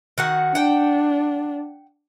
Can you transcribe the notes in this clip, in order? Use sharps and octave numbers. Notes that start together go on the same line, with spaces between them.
D#3 F#4 F#5
D4 F#5 G5